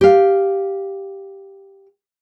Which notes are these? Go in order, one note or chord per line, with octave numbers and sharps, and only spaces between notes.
G4 F5